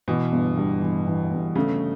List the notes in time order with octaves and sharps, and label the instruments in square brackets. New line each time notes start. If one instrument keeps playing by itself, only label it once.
[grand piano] B2 [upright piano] E3
[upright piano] G1
G2
E3
E3
G1
[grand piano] C#3 [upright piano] A3